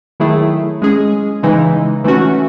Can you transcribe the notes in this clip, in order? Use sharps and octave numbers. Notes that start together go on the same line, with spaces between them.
D#3 F#3 A3 E4 G#4
G#3 C#4 G#4
C#3 E3 G#3 D#4
E3 A3 C#4 F#4